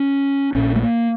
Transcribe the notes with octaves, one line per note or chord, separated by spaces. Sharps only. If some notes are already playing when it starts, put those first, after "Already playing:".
Already playing: C#4
A#1 A#2 C#4
A3
A#3